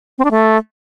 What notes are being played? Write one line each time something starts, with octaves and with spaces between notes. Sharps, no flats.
C4
D4
A3